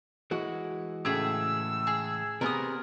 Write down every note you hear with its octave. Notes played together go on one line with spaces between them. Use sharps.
E3 G#3 F#4
A2 C#3 A3 G4 G#4 E6
G#4
C3 B3 G#4 A#4 D#6